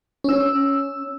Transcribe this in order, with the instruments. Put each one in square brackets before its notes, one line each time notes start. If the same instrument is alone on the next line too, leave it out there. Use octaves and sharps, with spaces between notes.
[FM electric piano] C#4 E6